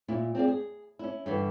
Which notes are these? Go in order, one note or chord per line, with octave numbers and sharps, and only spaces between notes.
A#2 E4
C4 F4 G#4 D5
G#4
C#4 E4
G2 D3 E3